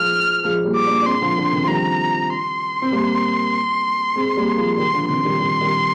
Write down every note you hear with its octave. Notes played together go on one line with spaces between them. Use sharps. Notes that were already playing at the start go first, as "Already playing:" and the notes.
Already playing: F3 G#3 F6
F3 G#3
G3 A#3
D6
A#3 D4
D4
G#3 C4 C6
D3 F3
D3
C3 D#3
F3
D#3 G3 A#5
C6
C4
G3 A#3
G#3 C4
G3 A#3
F3 G#3
D#3 G3 C6
D3 F3
C3 D#3 C6
D#3 G3
D#3 G3
D#3 G3